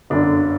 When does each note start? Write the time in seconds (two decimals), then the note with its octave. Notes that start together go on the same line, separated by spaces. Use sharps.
0.10 G1 F#2 D3 D4